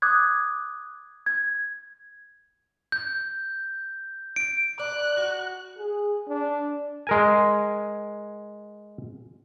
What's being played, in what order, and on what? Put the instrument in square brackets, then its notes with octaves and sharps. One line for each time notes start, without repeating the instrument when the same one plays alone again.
[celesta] D6 D#6 F#6 G#6
G#6
[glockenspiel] G6
D7
[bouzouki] D5 [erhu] F#6
[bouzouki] F#4
[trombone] G#4
D4
[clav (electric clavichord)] G#3 A#4 G#5